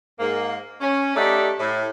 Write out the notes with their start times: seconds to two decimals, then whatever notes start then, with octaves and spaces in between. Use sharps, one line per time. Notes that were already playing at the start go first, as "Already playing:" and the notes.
0.20 G#2 A#3
0.81 C#4
1.16 A3 D#4 G4 D5 E5 F#5
1.59 A2